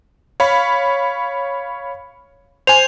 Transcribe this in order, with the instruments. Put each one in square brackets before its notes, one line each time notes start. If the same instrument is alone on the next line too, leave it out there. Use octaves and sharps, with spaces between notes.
[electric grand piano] C#5 F5 B5
[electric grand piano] C5 G#5 [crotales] F7